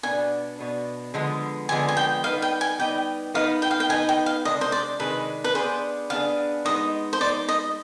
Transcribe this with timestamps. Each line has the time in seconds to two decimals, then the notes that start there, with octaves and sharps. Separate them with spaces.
0.03 B2 B3 D4 G#5
0.59 B2 B3 D4
1.14 D3 F3 G#3 B3
1.69 D3 F3 G#3 B3 G#5
1.89 G#5
1.97 G5
2.24 G3 B3 D#4 B4 F5
2.42 G5
2.61 G#5
2.79 G3 B3 D#4 B4 G5
3.34 B3 D#4 B4 F5
3.62 G5
3.71 F5
3.80 G5
3.89 B3 D#4 B4 G#5
4.09 G5
4.26 F5
4.45 C3 D#3 G#3 D4 G#4 D#5
4.61 C5
4.72 D5
5.00 C3 D#3 G#3 D4 G#4 B4
5.44 B4
5.55 B3 D4 G#4 C5
6.10 B3 D4 G#4 F5
6.65 G#3 B3 D#4 D#5
7.13 C5
7.21 G#3 B3 D#4 D5
7.49 D#5